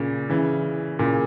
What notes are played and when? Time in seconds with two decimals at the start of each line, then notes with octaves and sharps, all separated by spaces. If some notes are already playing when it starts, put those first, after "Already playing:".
Already playing: A#2 C#3
0.30 C#3 E3
0.99 A#2 C#3